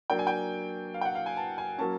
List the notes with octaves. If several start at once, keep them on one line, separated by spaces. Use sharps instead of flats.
F#3 A#3 D4 G5
G#5
G5
F5
G5
F#5
F5
G#5
A5
G#5
F#3 A#3 C#4 A5